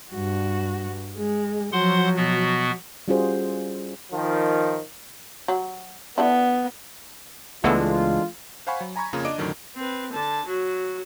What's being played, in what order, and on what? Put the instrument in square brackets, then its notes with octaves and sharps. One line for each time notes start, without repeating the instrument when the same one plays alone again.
[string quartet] G2 F#4
G#3
[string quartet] F3 F#3 [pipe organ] C5 F#5 C6
[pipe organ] B2 B3 F#4
[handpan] G3 C#4 F4 F#4 G#4 C5
[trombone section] D#3 F3
[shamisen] F#3
[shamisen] D3 D4 E4 [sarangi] B3
[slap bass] C#2 [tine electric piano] E3 G#3 D4 [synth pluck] A3 B3 A4 [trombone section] F4
[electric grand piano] C5 F5 F#5 G#5 B5 C#6
F#3
G#5 A#5 B5 C#6 G#6
F2 C#3 A#3 F4 C#5 A#5
D4 D#5 D6 D7
F2 A2 D3 D#3 F#3
[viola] C4 B4
D3 A5
F#3 F#4